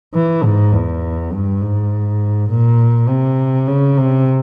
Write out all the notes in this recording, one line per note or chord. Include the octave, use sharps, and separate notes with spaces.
E3
G#2
E2
G2
G#2
A#2
C3
C#3
C3